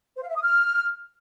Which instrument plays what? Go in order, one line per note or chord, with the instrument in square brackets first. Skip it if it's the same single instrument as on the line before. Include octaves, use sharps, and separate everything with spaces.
[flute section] C5
F5
E5
D#6
F6